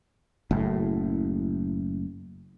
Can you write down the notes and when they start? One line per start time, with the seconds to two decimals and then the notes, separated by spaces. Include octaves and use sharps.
0.51 F#1 A2